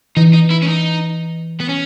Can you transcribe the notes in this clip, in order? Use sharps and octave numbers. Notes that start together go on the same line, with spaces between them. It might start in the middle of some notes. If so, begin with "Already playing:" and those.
E3 D#4
D#4
E4
C#4
D#4
B3
C#4